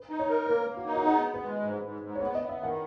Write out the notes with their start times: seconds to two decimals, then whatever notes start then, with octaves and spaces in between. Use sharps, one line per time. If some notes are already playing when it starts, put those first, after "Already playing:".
Already playing: B4
0.09 D#4
0.19 C#5
0.29 A#4
0.47 A#3 B4
0.67 A#3
0.77 F#4
0.86 D#4
0.95 F#4
1.05 B3 G#4
1.25 B3
1.34 B4
1.44 G#3
1.63 G#2
1.82 G#2
2.02 G#2
2.15 C#5
2.20 B3 B4
2.35 B3 D#5
2.49 E5
2.59 D#3 F#5